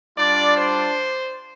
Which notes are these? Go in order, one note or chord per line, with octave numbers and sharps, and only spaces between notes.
G3 D4 F4 D5
C5